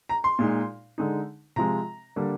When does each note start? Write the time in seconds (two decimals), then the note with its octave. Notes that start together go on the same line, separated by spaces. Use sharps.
0.09 A#5
0.24 C6
0.39 A#2 G#3 D#4
0.98 D3 G#3 D#4
1.56 C3 F3 G#3 A#5
2.16 D3 G3 A#3 D4